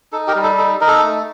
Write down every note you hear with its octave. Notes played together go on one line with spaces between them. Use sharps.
D#4 A4
G4 A#4
G3
A4
D#4 A4
D#4 A#4
A4
A3